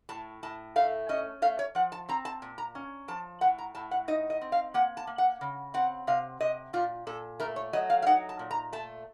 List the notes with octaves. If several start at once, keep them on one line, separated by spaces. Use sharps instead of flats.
A2 A5
A2 A5
A3 F5
C#4 D#5
A3 F5
C#5
F3 F#5
A5
C4 A#5
A5
A#2
A#5
C#4
F3 A5
A2 F#5
A#5
A2 A5
F#5
D#4 D#5
D#5
C4
F5
A#3 F#5
A5
A#3
F#5
C#3
C4 F#5
C3 F5
C3 D#5
A#2 F4
A#2 A4
A3 A#4
C#5
F#3 D#5
F5
F5
D#4 F#5
A5
A#2
A#5
A3 A5